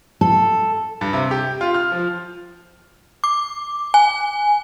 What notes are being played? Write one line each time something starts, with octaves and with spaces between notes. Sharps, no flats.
A4
G2
C3
G4
F4
F6
F3
D6
G#5